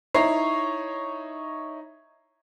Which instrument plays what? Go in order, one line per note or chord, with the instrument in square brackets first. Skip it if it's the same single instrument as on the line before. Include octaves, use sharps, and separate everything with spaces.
[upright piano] D#4 E4 C#5 A#5 C7